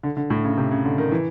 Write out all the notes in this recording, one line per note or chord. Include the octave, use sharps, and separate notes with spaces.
D3
D3
A2
C#3
C3
C#3
D3
D#3
E3